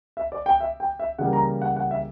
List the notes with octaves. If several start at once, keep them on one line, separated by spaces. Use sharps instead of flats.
E5
D5
G5
E5
G5
E5
C#3 E3 G3 A#3 F#5
A#5
F#5
F#5
E5